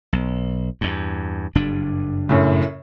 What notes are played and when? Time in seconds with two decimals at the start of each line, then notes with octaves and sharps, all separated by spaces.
0.13 B1
0.81 E2 G2
1.55 F#1 G2 D4
2.29 F#2 A2 C#3